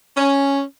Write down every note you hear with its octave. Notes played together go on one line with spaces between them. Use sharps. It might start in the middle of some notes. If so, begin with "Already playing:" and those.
C#4